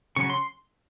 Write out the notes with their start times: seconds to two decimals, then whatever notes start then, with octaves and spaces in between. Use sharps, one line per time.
0.16 C#3 F#3 C#4 C#6
0.30 C6